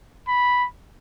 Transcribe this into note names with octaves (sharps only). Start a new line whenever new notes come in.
B5